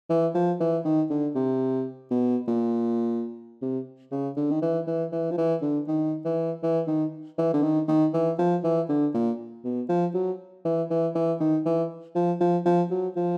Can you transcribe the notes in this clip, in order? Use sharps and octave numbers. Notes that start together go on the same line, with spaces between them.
E3
F3
E3
D#3
D3
C3
B2
A#2
C3
C#3
D3
D#3
E3
E3
E3
F3
E3
D3
D#3
E3
E3
D#3
E3
D3
D#3
D#3
E3
F3
E3
D3
A#2
B2
F3
F#3
E3
E3
E3
D#3
E3
F3
F3
F3
F#3
F3